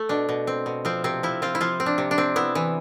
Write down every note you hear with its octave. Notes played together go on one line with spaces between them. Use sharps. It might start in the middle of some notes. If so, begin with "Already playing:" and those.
Already playing: A3
B2 D4
B2
C4
B2
F3 C4
C3 C4
F3 E4
C4 F4
E4
F3 F4
C4
D4
C3
D4
C4
B3 E4
E3